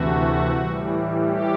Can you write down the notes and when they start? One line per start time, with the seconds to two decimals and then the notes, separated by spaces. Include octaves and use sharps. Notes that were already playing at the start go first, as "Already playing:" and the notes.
Already playing: D2 C3 E3 A3 F#4
0.53 A2 E3 G3
1.26 G4